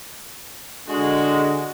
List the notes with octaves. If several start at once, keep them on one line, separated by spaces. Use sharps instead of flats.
D3 G#3 F#4